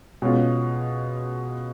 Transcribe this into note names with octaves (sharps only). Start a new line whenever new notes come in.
B2 G#3 C#4 F4